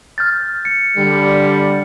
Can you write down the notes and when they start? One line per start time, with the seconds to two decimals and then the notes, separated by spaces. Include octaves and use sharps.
0.18 F6 G6 A6
0.65 C#7
0.96 D3 G3